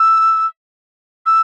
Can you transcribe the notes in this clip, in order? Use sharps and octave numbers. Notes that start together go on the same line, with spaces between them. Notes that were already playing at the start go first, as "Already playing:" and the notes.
Already playing: E6
E6